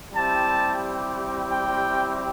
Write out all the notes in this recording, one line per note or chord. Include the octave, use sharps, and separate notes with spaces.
G3 C4 E4 G4 A5
G5